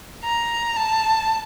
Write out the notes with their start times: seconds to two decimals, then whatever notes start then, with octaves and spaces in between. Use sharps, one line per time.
0.24 A#5
0.77 A5